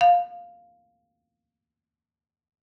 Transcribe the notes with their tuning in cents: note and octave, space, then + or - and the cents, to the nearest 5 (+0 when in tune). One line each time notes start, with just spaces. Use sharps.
F5 +5